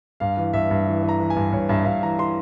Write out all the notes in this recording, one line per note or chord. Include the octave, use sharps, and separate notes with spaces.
G2 F5
E3
G2 E5
G2
E3
E3
A#5
E3
G#5
G2
G2 C#5
G2 E5
G2 F5
E3 A#5
E3 C6